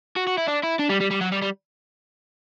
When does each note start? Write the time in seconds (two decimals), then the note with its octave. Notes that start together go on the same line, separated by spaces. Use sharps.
0.16 F#4
0.27 F#4
0.38 E4
0.47 D4
0.63 E4
0.79 D4
0.89 G3
1.00 G3
1.11 G3
1.21 F#3
1.32 G3
1.42 G3